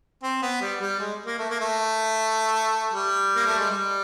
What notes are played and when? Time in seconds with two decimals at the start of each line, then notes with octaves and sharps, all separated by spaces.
0.23 C4
0.42 B3
0.61 G3
0.81 G3
1.00 G#3
1.26 A#3
1.39 A3
1.50 A#3
1.60 A3
2.92 G3
3.36 A#3
3.47 A3
3.59 G#3
3.70 G3